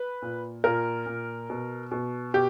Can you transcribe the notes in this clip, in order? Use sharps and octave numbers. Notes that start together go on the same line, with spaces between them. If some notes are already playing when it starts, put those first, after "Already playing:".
Already playing: B4
A#2
A#2 A#4
A#2
B2
B2
B2 G4